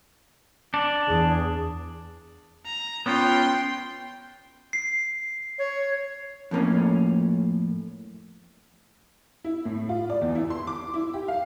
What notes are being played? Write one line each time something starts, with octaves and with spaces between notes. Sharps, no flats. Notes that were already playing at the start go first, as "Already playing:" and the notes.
D4
E2 G#4
A#5
B3 C#4 F4 G5 C6
C7
C#5
F2 A2 A#3 C#4
E4
A2
F4
D5
E2
E4
C6
D6
E4
G4
F5